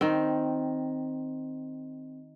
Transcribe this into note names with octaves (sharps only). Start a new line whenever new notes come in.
D#3 C4